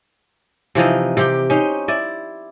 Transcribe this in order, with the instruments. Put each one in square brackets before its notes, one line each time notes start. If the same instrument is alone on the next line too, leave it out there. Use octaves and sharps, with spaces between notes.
[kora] C3 E3 F3 D#4
C3 G4 G5
C#4 D#4 C5
E4 D5